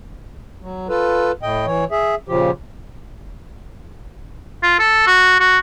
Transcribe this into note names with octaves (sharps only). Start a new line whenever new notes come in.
F#3
F4 A4 B4
A2 D#5 G5
E3 C#5
G#4 E5
A#2 C#3 F3 G4
F4
A4
F#4
F#4